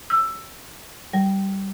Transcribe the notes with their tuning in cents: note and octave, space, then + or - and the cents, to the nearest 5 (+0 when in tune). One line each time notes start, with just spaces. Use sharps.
E6 +10
G3 -15